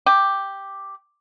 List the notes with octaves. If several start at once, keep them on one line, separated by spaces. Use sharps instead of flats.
G4